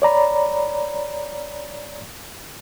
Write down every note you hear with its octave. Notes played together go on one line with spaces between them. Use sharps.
C#5 D5 A#5 B5